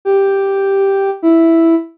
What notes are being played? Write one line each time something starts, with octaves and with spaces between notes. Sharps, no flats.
G4
E4